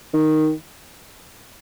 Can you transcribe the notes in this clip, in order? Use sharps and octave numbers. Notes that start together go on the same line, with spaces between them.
D#3